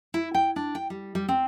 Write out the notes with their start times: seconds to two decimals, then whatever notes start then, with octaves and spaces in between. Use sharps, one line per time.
0.14 E4
0.34 G5
0.56 D4
0.75 G5
0.90 G3
1.15 G3
1.29 C4